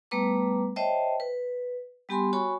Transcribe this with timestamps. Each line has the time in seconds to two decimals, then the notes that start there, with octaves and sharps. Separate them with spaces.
0.11 G3 A3 B3 B4 A#5 D6
0.76 C5 C#5 D#5 E5 G5 A5
1.20 B4
2.09 G3 B3 G4 G#5 B5 C6
2.33 F#4 C#5 G#5 B5 C#6